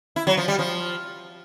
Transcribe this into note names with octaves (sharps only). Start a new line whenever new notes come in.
E4
F#3
F3
G3
F3